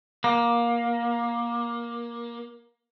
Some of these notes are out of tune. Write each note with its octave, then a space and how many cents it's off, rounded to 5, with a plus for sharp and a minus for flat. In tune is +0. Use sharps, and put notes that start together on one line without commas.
A#3 +20